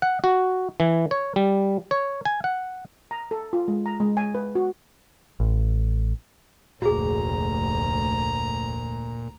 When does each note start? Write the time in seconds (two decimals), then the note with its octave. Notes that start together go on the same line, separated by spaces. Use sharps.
0.02 F#5
0.24 F#4
0.80 E3
1.11 C#5
1.36 G3
1.91 C#5
2.25 G#5
2.44 F#5
3.11 A#5
3.31 A4
3.53 F4
3.68 G#3
3.86 A#5
4.00 G#3
4.17 G#5
4.35 B4
4.55 F#4
5.40 A1
6.82 F1 D2 A#2 F#4 G#4 A#5